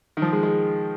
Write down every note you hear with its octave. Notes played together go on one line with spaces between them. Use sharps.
D#3
F3
G#3
G#3